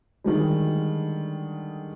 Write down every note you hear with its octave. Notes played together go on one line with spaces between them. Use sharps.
D3 D#3 G3 G#3